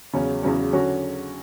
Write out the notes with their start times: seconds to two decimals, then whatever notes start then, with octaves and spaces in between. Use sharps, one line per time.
0.13 E2 C#3 F#3 C#4
0.43 E2 C#3 F#3 C#4
0.72 D3 F#3 C#4 F#4